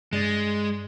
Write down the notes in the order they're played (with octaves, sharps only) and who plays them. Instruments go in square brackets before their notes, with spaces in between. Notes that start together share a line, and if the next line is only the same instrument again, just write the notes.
[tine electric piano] G2 D5 A6 [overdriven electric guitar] G#3